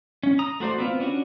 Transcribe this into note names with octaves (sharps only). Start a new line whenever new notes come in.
C#4
A#5 D#6
A3 F#4 C5 D5
B3 C4 F4
C#4 D4 F#4